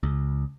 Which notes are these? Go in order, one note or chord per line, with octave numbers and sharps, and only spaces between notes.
C#2